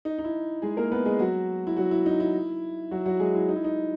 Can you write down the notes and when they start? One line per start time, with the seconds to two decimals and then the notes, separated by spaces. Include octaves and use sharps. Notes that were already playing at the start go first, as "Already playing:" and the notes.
0.05 D#4
0.18 D#4
0.24 E4
0.62 G#3 G#4
0.77 A#3 A#4
0.92 B3 B4
1.05 G#3 G#4
1.19 F#3 F#4
1.67 E4
1.77 F#3 F#4
1.91 E4
2.06 D#4
2.20 E4
2.91 F#3 F#4
3.05 F#3 F#4
3.19 G#3 G#4
3.35 E4
3.49 D#4
3.56 E4
3.64 D#4